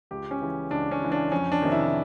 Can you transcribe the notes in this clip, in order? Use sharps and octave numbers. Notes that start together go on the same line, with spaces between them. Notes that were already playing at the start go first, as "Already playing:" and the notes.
C#2 G4
C#4
C#3 E3
C#2 D4
C#4
C#3 E3
D4
F2 C#4
D4
C3 D#3
E4